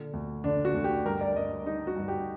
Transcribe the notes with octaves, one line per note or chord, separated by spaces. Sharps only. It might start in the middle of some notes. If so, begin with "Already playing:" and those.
Already playing: A#2 D3
D2
D3 D4
F#4
D2
G4
G2 A#4
D5
G2 D#5
G3 D#4
F#4
G2
G4